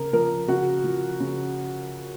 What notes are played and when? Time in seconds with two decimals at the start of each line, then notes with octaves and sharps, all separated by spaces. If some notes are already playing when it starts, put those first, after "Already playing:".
Already playing: C#3 A#4
0.13 F3 A#4
0.48 C#3 F#4
0.84 F3
1.20 C#3